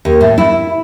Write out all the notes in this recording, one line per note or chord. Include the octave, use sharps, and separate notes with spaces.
D#2
A2
E4